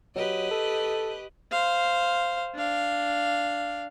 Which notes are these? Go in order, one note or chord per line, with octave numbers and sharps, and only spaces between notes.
F#3 G4 B4 D#5
A4
C5 F5
D4 F5